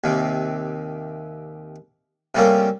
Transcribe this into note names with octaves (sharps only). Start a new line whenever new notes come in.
D#2 C3
C3 G3 A3 A#3 C#4